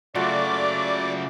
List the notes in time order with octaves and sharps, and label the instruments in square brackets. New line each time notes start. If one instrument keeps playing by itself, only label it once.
[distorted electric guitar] C#3 F#3 [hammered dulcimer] A3 F4 F#4 [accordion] D5 D6